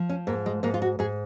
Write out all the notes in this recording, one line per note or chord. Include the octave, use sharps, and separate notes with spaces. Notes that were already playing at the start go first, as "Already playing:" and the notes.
Already playing: F3
C#4
G#2 A#3
G#3
G#2 A#3
F4
F#4
G#2 G#4